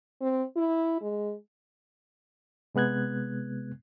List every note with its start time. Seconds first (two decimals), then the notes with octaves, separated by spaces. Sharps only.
0.21 C4
0.57 E4
1.01 G#3
2.75 C3 G#3 B3 F#6 G#6